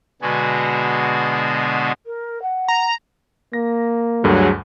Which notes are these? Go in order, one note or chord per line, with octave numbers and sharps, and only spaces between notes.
B2 D3 G#3 B3 F#4 G#4
A#4
F#5
A#5
A#3 A#6
D2 G2 D3 F#3 G#4